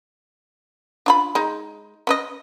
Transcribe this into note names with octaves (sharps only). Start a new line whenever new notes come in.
D4 F4 B5
G#3 D#4
C#4 B4 D#5